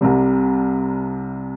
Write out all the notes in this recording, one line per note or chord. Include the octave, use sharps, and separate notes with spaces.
C2 C3 G3